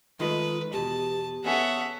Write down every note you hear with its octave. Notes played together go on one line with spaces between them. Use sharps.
D#3 G#3 A3 F4 B4
E2 B2 G4 A5
B3 C#4 G#4 A4 C#5 E5 F#5